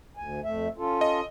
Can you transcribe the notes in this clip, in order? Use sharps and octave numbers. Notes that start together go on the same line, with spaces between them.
D2 G#5
F2 A3 E5
C#4 F4 A4
D#5